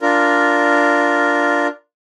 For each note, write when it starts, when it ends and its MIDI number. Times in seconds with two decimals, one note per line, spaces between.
0.01 1.67 62
0.01 1.67 65
0.01 1.67 70